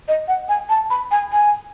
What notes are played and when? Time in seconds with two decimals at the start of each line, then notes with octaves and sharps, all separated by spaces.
0.08 D#5
0.28 F#5
0.49 G#5
0.69 A5
0.90 B5
1.11 G#5
1.32 G#5